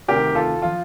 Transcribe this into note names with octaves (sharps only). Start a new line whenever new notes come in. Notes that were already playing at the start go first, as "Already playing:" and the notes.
D2 C3 D#3 G4 A#4
F4 A4
F3 F4